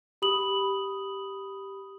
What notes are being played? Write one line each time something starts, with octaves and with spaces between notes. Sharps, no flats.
G4 B5 D#6 F#7